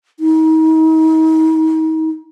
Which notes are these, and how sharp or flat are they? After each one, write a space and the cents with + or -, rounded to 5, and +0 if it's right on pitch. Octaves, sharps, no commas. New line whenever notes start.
D#4 +40